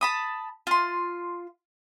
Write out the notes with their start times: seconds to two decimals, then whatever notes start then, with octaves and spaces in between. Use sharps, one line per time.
0.01 A5 B5 D#6
0.67 F4 C6